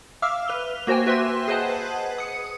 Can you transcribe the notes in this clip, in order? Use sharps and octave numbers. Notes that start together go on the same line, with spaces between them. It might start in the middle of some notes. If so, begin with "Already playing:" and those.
E5 F5 D6 E6 F6
B4 F7 G7
A#3 F#4 C5 G5 G#5
F#4 B4 E5 G5 C6
G#4 B4 C5 D#5 F#5 A5
D#6 C#7